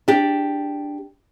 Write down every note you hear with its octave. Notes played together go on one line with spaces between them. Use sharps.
D4 G4